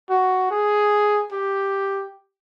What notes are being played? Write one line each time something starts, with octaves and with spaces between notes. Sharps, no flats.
F#4
G#4
G4